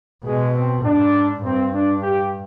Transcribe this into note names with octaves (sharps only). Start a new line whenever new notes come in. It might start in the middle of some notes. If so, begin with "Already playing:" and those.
B2 G#3
C4
G#2 D4
G2 C4
D4
G4